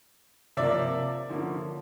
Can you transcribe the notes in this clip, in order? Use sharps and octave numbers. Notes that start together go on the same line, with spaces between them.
C3 F3 A#3 D5 E5
D3 F3 A#3 C#4